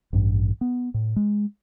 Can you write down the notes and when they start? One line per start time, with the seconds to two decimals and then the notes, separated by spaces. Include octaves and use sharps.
0.13 A1 G2
0.61 B3
0.94 A2
1.16 G#3